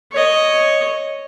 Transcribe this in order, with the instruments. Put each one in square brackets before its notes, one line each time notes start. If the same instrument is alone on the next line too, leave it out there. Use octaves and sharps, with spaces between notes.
[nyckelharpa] C#5 D#5